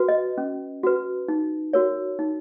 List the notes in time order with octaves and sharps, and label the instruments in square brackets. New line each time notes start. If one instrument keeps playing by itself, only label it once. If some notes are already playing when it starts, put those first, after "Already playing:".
Already playing: [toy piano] F#4 B4
D#5
C#4
F#4 B4
D#4
F#4 A#4 C#5
D#4